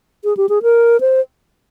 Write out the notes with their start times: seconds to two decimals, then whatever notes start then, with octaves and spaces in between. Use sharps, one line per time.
0.24 G#4
0.37 G4
0.49 G#4
0.63 A#4
1.00 C5